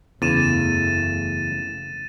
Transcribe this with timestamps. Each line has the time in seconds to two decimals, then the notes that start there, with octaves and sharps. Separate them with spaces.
0.22 F#1 E2 C#3 A3 A6 D#7 E7